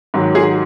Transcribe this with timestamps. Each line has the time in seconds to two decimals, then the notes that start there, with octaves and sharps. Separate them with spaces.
0.14 G#2 D#3 F#3
0.35 G#4